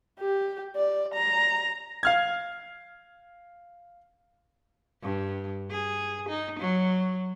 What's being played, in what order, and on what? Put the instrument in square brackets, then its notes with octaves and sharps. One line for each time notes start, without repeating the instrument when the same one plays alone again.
[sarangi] G4
D5
A#5
[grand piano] F5 F6 G#6
[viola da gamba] G2
G#4
D#4
F#3